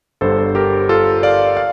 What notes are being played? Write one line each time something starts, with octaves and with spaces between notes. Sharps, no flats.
G1 G2 D3 G3 A4 C5
G4 A#4
F4 A4
D5 F5
F5